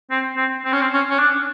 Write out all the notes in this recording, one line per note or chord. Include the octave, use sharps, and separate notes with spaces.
C4
C4
C4
C#4
C4
C#4
C#4
D4